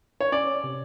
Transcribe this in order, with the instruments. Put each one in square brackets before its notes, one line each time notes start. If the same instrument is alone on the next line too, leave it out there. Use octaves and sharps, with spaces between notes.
[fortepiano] C#5
[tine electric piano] C#4 [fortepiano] D5
[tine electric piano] C3